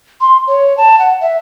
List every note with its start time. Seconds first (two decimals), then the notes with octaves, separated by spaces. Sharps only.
0.21 C6
0.47 C#5
0.78 A5
0.99 F#5
1.21 E5